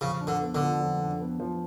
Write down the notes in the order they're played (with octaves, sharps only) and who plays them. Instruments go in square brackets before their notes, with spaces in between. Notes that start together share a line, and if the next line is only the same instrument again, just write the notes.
[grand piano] F2 [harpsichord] C#3
[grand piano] D4
[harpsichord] D3
[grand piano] B3
[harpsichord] D3
[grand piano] F3
F2
D4
B3
F3